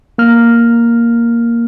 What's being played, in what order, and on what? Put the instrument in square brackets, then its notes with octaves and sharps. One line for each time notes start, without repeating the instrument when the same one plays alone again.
[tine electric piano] A#3 F6